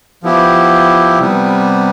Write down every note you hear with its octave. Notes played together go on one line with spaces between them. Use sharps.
F3 B3 E4 G4
C3 G3 B3